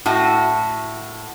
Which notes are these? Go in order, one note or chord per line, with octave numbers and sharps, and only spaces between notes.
A2 F#4